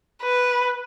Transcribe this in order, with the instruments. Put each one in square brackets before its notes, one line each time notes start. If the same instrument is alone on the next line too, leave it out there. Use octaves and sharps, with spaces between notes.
[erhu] B4